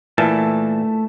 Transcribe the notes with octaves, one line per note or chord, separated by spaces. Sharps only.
A#2 E3 A3 E5 A5